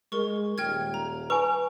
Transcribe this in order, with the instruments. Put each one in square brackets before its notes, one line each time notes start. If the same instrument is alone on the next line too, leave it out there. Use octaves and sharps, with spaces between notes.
[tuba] G#3 [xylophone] A#4 C#6
[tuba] D#1 [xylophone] G5 F6 G#6
[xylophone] A#5
[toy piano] B4 G#5 [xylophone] C#6